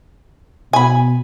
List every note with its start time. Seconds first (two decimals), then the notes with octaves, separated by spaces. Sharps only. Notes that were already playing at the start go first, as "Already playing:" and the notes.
0.73 B2 G#5 B5